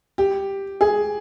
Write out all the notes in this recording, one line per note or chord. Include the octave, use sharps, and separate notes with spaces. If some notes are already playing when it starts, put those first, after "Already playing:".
G4
G#4